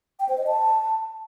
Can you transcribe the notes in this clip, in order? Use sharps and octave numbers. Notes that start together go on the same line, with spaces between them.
G5
C5
D#5
A5